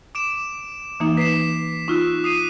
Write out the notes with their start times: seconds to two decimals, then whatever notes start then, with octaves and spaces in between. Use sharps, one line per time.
0.15 D6 D7 E7
1.00 E3 A#3 D#4
1.17 B4 B6 C7 E7
1.88 D#4 F4 C#6 E6 F#6
2.24 D#6 C7 D#7